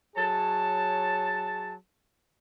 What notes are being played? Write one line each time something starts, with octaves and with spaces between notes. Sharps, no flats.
F#3 G#4 C#5 A5